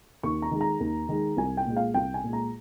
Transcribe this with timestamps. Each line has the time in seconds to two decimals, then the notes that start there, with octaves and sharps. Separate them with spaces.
0.23 D#2 C#6
0.42 A#5
0.51 D#3 G#3
0.61 A#5
0.80 D#2
1.09 D#3 G#3
1.37 C2 G#5
1.57 G5
1.66 A#2 G#3
1.77 F5
1.94 C2 G5
2.14 G#5
2.24 A#2 G#3
2.33 A#5